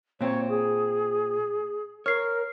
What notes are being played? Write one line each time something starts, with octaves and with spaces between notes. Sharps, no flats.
A#2 C4 C#5
G#4
A#4 C#5 F6 C7